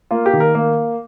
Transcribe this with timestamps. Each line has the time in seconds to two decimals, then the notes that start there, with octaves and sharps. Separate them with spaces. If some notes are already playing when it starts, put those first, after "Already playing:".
0.11 A#3 F4
0.26 G4
0.33 D#3
0.40 A#4
0.55 A#3